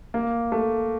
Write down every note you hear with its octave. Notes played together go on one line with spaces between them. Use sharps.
A#3
A3